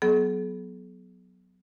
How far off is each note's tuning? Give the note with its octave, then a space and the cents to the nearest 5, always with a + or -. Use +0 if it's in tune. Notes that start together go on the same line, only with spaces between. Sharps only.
F#3 +0 B3 +0 G#4 +45